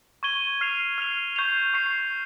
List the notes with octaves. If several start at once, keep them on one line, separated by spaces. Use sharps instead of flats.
C#6 G#6 D#7 G7
F6 C7 F7
F6 C7 F7
C#6 G6 C7 F7
C#6 G6 C7 F7